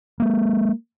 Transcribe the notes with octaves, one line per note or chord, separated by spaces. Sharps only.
G#3 A#3